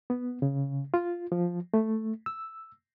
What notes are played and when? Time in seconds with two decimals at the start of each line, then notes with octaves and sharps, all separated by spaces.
0.10 B3
0.42 C#3
0.94 F4
1.32 F3
1.74 A3
2.26 E6